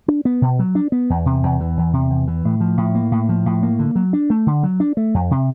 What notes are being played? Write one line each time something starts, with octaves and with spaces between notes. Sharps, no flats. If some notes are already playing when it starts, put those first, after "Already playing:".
D4
B3
B2
F#3
D4
B3
E2
C3
E2
E3
E2
C3
E2
E3
A2
F3
A2
A#3
A2
F3
A2
A#3
D3
F#3
D4
A3
D3
F#3
D4
A3
F2
C3